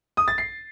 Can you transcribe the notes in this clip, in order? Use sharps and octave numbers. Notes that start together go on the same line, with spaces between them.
D#6
A6
C7